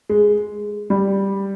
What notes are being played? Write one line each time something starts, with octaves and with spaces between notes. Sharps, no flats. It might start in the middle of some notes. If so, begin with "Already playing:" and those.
G#3
G3